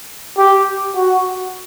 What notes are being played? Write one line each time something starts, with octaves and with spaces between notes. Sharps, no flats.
G4
F#4